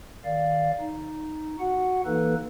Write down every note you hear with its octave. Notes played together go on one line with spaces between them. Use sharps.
D#3 D5 F5
D#4
F#4 F#5
E3 A#3 D#4 A4 B4